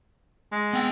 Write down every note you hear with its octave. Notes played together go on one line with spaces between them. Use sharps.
G#3
B3 G5